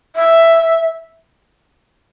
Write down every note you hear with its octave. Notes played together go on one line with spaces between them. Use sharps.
E5